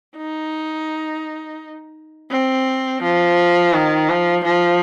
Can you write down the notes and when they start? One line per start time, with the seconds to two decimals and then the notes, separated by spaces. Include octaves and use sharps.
0.17 D#4
2.31 C4
3.02 F3
3.73 D#3
4.09 F3
4.44 F3